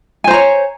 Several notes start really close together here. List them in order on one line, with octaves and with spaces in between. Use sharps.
G#5 C5 A#5 C#5